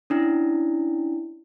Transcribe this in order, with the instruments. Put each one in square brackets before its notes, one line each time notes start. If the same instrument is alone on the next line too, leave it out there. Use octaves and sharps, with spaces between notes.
[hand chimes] C#4 D4 E4